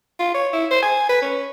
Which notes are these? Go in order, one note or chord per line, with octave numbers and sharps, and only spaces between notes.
F4
C#5
E4
C5
G#5
B4
C#4